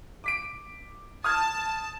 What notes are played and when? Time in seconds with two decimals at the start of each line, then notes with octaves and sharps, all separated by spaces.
0.24 D6 B6 D7
1.24 A5 D#6 F6 G#6